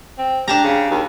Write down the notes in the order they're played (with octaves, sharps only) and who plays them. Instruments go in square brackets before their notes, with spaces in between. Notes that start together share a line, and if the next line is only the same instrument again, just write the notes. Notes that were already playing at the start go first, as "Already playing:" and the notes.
[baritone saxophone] C4
[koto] D4 A5 A#5 [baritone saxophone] G4
[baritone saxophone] C#3
D#2